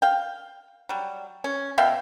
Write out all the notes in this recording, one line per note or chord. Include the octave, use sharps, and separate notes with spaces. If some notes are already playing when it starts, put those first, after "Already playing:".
F5 G5
F#3 G3
C#4
B2 E5 F5 G5